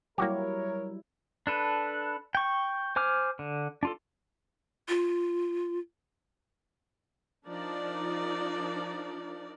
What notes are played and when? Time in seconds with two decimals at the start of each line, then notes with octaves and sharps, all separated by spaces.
0.18 F#3 G3 A#3 E4 F#4 G4 A#4 C#5
1.47 D4 A4 B4
2.35 G5 C#6
2.96 C5 G#5 D6 F6
3.39 D3
3.83 D4 F4 A4
4.88 F4
7.47 F3 D4 D#4 A#4 D5